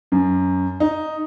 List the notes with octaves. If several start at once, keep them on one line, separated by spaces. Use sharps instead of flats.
F#2
D#4